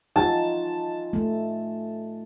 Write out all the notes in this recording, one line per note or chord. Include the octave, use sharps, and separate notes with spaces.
D#4 F4 A5
A3